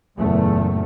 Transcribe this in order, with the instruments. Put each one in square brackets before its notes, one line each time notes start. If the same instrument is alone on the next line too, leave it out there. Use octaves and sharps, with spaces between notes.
[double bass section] F#1 E2 A#2 A3